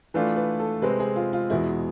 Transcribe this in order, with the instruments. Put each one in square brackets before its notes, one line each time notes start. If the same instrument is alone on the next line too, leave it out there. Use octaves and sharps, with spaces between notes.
[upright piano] E3 A3 D4 F4 [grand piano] B4
[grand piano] B4
A4
[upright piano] C3 G#3 C4 [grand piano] B4
[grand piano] G#4
F4
F4
[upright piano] E2 B2 G#3 [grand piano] E4